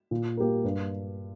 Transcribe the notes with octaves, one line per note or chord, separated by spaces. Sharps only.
A#2
A#3 G4 A#4
G2